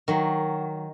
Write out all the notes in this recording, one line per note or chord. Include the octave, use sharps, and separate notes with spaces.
D#3 F#3